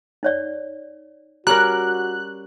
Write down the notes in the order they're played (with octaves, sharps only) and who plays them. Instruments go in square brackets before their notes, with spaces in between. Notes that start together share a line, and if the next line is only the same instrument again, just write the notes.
[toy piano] D#4 C#5 D5
[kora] G3 C#4 A#4 [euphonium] F#4 [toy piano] A#5 [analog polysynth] F#6